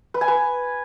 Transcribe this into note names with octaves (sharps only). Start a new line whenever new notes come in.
B4
G#5
B4